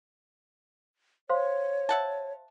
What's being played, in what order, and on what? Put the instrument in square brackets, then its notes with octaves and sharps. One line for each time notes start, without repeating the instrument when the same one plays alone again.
[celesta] C5 F5 C6 [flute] C#5
[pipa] E5 F#5 A5